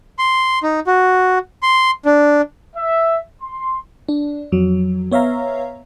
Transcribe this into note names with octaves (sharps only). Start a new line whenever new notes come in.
C6
D#4
F#4
C6
D4
E5
C6
D4
F2 F#3
B3 C#5 E5 F5 A#5